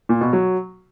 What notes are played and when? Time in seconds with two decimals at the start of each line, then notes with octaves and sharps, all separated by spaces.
0.09 A#2
0.21 B2
0.33 F#3